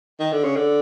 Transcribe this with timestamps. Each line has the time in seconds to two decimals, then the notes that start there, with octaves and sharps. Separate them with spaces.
0.20 D#3
0.32 D3
0.44 C#3
0.56 D3